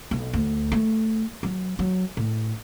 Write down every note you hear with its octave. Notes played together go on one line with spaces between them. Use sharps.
B1
D2
A3
F#3
F#3
A2